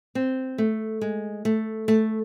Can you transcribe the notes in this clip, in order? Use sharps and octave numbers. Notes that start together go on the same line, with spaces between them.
C4
A3
G#3
A3
A3